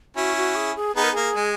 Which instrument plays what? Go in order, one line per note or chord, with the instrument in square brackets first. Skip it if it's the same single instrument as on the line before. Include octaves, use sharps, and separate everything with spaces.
[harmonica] C#4 E4 [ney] F#4
[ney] F#4
G#4
G#4
[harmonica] B3 D#4 [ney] G#4
[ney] A#4
[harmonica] A#3 [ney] G#4
[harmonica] G#3